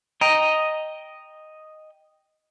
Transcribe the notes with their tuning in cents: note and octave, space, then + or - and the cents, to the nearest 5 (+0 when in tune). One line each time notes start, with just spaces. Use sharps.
D#5 +0 G5 +5 A#5 +0